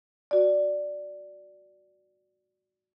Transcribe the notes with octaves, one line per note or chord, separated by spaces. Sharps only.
F#4 D5